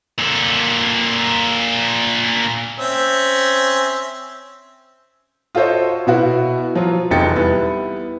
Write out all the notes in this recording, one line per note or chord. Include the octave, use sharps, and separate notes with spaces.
A#2 A4
C4 C#4 E5
F4 F#4 A4 C5 C#5 D#5
B2 B3 E4 F#4
F3 F#3 F4
F1 E2 D#4 G5 A6 C#7
G3 B3 E4